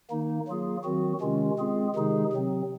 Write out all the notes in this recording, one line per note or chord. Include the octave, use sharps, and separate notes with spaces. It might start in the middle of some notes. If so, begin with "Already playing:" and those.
D#3 A#3 D#4
F#3 A#3 F4 G#4
D#3 F#3 C4 F#4
C3 D#3 G#3 C#4 F4
G#3 C4 F4 G#4
C3 D#3 G#3 D#4 G#4
C3 F#3 C4